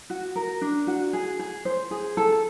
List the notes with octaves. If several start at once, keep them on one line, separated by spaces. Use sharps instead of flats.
F#4
A#4
D4
F#4
G#4
G#4
C5
G#4
A4